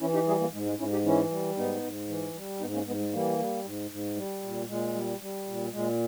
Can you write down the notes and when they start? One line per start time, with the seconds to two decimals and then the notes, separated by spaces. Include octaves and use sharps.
0.01 E3 C#4 E4
0.14 D#4 G4
0.27 G3 E4 G#4
0.40 G3 A#3
0.53 G#2 G#3
0.66 G#3
0.79 G#2 C#4 E4
0.92 D#4 G4
1.05 E3 C#4 E4
1.31 G3
1.57 G#2 B3 D#4
1.83 G#2
2.09 E3
2.35 G3
2.60 G#2 B3 D#4
2.74 A#3 C#4
2.87 G#2 G#3 B3
3.00 G#3
3.13 E3 G3 A#3
3.39 G3
3.64 G#2
3.91 G#2
4.17 G3
4.43 A#2
4.68 A#2 G#3
4.94 G3
5.21 G3
5.47 A#2
5.72 A#2 G#3